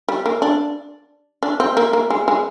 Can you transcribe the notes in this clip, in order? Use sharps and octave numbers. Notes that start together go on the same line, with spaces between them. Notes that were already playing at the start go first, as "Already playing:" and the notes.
G3
A#3
D4
D4
C4
A#3
A#3
G#3
G#3